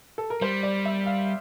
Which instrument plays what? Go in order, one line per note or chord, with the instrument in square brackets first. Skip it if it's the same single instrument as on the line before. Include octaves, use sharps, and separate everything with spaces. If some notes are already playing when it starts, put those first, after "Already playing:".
[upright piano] A4
A#4
[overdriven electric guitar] G3 [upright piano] C5
[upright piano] D5
E5
F5